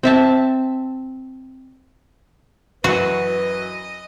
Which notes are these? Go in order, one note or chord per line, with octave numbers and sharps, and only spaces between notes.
C4 E5 A5
F#2 E3 F#3 F#4 B4 D#5